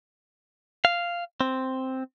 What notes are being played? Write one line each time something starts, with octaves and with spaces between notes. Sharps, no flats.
F5
C4